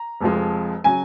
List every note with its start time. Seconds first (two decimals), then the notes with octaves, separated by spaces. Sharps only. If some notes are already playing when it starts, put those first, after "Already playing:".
Already playing: A#5
0.21 F1 F2 F3 G#3
0.84 C#3 F#3 G#5